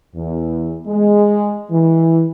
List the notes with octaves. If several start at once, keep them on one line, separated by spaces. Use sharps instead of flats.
E2
G#3
E3